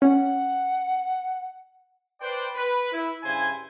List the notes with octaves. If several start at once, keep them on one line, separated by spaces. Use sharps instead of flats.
C#4 F#5
B4 C5 D5 G5
B4
E4
G2 C#3 E4 C5 G#5